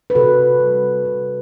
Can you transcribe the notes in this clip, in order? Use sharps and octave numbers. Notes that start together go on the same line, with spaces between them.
B4
C3 F#4 A4
G3
C3